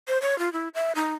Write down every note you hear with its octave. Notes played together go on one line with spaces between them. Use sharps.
C5
C#5
F4
E4
E5
D#4